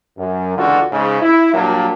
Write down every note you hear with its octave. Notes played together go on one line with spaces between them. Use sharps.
F#2
C#2 D3 E3 F4 F#4
G#2 C#3
E4
A#2 F#3 G3 A#3 D4